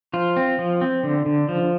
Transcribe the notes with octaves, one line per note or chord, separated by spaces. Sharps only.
F3 F4
C4
F3
C4
D3
D3
F3